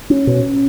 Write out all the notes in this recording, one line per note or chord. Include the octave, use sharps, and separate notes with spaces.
C#4
B2